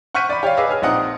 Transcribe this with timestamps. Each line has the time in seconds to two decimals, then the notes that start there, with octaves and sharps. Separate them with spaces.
0.14 F#5 C#6 F6 G6 B6 D#7
0.29 D5 B5
0.43 G4 C#5 D5 F5
0.57 G#4 B4 D#5 F5 D6 E6
0.69 C#5 G#5 F6
0.82 A#1 C4 D#4 F#5 D#6